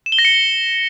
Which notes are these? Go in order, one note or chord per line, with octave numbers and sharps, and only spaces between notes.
E7
G7
A#6
C#7